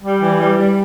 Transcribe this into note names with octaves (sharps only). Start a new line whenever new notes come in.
G3
E3
G3
G3